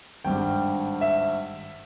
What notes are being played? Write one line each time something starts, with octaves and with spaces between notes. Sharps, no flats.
G#1 G2 G3 G5
E5